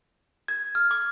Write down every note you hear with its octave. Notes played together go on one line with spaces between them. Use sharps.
G#6
F6
D6